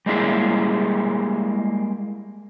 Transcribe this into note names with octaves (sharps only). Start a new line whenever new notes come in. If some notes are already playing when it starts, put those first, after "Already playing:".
G3 G#3 A#3 E4 G#4